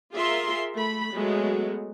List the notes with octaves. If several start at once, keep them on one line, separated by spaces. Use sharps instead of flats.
F4 G#4 A#4 E5 C6
A3 B5
F#3 G#3 A3 B3